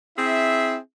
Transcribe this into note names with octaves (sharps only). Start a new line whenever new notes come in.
C4 E4 G#4 E5